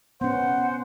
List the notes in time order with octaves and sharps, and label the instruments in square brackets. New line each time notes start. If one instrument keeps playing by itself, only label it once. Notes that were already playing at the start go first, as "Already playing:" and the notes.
[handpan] B3 C#4 [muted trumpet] C5 [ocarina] F#5